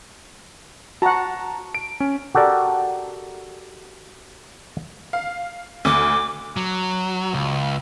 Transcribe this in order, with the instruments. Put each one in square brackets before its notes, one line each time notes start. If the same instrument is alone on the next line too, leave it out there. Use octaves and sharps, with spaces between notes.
[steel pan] F#4 F#5 [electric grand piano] A5 A#5
[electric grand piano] D7
C#4
[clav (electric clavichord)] F#4 G4 A4 A#4 D5
[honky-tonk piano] F5
[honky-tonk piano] D2 [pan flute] D6
[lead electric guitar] F#3
C#2